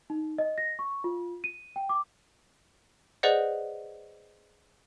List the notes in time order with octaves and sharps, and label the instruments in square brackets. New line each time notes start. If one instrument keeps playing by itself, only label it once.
[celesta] D#4
D#5
A#6
C#6
F4
D#7
G5
D6
[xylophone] G#4 B4 C5 D5 D#5 F#5